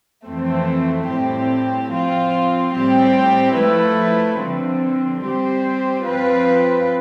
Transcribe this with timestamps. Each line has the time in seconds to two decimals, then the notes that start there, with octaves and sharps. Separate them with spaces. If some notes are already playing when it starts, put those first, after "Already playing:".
0.25 F2 E3 A3 C4
1.08 A2 G3 C4 G4
1.91 F3 C4 F4
2.74 A2 G3 C4 G4
3.56 F3 A3 E4 B4
4.39 D3 F3 C4
5.22 G3 C4 G4 C5
6.05 F3 C4 F4 B4